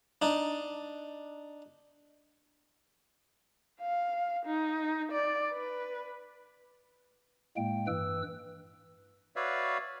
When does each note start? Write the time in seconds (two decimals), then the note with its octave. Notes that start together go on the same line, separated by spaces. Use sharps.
0.22 D4 D#4
3.80 F5
4.45 D#4
5.12 D5
5.52 B4
7.57 A2 G#3 A#3 G5
7.87 G2 E3 B4 E6
9.36 F#4 B4 C#5 D5 E5 F5